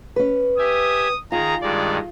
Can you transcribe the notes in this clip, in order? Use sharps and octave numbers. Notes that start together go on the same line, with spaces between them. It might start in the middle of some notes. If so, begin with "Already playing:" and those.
C#4 B4
G4 E5 G#5 D#6
D#3 F4 G#4 A#5
G2 D#3 G#3 D5